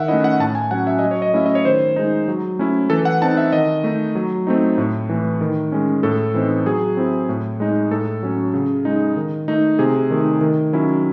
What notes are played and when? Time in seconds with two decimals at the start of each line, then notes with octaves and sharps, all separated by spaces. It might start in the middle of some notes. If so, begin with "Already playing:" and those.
Already playing: D#3 E5 F#5
0.08 A3 C#4 E4 D#5
0.24 F#5
0.40 A2 A5
0.55 G#5
0.71 F#3 C#4 F#5
0.87 E5
0.99 F#3 D#5
1.11 C#5
1.22 D#5
1.33 A3 C#4 E4 E5
1.46 D#5
1.55 C#5
1.65 D#3 C5
1.96 G#3 D#4
2.28 F#3
2.59 A3 C#4 E4
2.90 E3 A4
3.05 F#5
3.22 C4 D#4 A5
3.37 E5
3.53 D#3 D#5
3.84 A3 D#4
4.15 F#3
4.47 A3 C4 D#4
4.78 A2
5.09 E3 A3
5.41 D#3
5.72 G#3 C#4
6.03 A2 A4
6.34 E3 C4 D#4
6.66 F#3 G#4
6.97 C4 E4
7.29 A2
7.60 G#3 D#4
7.91 A2 A4
8.23 F#3 C#4
8.54 C#3
8.85 G#3 D#4
9.16 D#3
9.48 A3 D#4
9.79 C3 G#4
10.10 D#3 A3 D#4
10.41 D#3
10.73 F#3 C#4 E4